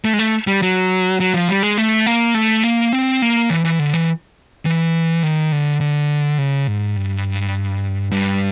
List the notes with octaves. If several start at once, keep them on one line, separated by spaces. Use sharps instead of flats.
A3
G#3
A3
G3
F#3
F#3
F3
G3
G#3
A3
A#3
A3
A#3
C4
A#3
E3
E3
D3
E3
E3
D#3
D3
D3
C#3
G#2
G2
G2